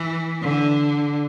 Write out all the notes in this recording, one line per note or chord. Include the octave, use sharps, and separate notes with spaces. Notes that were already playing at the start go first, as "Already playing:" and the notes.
Already playing: E3
D3